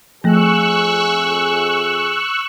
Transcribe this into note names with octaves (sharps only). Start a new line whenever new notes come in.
F2 F3 A3 G#4 C#6 E6 F#6